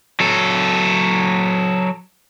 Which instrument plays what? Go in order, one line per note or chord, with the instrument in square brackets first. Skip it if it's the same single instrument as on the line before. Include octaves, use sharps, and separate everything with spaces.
[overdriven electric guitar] F#3 A4